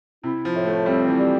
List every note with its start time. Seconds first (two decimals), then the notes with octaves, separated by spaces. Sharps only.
0.23 C3 E4
0.45 F3
0.55 A2
0.66 A3
0.86 G3 C4
1.07 E3
1.19 G3